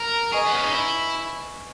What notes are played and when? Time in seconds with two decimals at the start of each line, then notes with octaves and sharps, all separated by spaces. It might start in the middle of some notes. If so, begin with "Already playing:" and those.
Already playing: A#4
0.32 G#4 B4 D#5 G#5 C#6
0.46 B3
0.55 C#4
0.63 D#4
0.72 E4